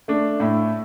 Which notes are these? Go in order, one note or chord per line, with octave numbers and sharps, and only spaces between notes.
A3 D4
A2 E4